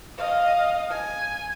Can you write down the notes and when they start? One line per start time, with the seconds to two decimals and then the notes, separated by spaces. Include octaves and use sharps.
0.17 D#5 F5
0.90 G#5